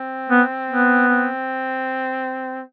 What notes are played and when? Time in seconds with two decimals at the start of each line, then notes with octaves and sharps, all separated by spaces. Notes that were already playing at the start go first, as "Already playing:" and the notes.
Already playing: C4
0.30 B3
0.70 B3
1.09 C4